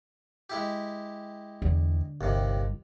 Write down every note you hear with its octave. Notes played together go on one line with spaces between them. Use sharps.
G#3 E4 G4
E2 D3
G1 D#2 C3